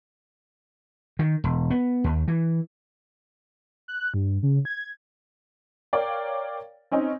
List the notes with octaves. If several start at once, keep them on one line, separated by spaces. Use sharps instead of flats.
D#3
E1
B3
D#2
E3
F#6
G2
C#3
G#6
A#4 C#5 D5 F5 G5
C4 C#4 D#4